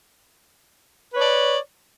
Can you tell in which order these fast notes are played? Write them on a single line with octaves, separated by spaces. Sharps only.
B4 C#5 D5